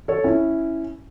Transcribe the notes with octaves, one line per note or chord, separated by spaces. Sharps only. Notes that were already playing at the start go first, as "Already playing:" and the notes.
A4 C#5
C#4 E4